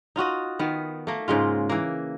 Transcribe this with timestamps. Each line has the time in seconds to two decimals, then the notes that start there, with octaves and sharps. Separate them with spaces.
0.16 D#4 F4 F#4 D#5
0.59 D#3 B3
1.07 A3 A#3
1.28 G#2 C#3 G#3 F4
1.69 E3 A#3